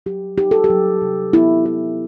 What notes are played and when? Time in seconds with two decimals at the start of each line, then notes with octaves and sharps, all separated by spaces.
0.06 F#3 G4
0.38 D#4 G4
0.51 A4
0.64 G4
0.70 F#3
1.02 C3
1.33 B3 E4
1.66 E4